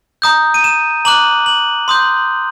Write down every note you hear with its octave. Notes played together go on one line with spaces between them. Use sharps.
A#5 D#6 G6
D#7
E7
A#5 D6 F#6 F#7
F#7
C6 D#6 G6